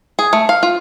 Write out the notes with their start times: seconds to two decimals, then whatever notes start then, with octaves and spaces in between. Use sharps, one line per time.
0.19 G#4
0.33 A3
0.49 F5
0.63 F4